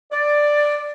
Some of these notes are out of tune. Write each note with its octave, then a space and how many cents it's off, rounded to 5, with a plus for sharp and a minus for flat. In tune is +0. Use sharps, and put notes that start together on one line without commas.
D5 +5